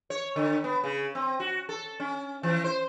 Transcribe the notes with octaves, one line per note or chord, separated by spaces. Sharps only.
C#5
D3
B3
C#3
C4
F#4
A4
C#4
E3
C5